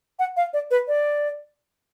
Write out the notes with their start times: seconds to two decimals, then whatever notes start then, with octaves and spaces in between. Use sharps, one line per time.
0.19 F#5
0.37 F5
0.53 D5
0.71 B4
0.88 D5